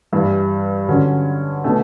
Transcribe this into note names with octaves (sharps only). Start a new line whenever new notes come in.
G2 E3 G3
D3 F#3 C#4
B2 A3